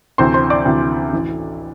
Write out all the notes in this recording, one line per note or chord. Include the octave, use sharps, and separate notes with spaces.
D2 C3 E3 C5 C6
C5 C6
D5 D6
D2 C3 E3
A1 A2 E3